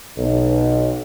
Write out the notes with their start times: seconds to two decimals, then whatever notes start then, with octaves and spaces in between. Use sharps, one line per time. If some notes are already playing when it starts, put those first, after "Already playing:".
0.16 B1